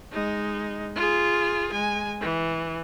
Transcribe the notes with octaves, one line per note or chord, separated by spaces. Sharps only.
G#3 D#4
F4 G#4
G#3 G#5
E3